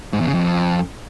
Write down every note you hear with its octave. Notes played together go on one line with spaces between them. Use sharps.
G#2
E2
C#3
F2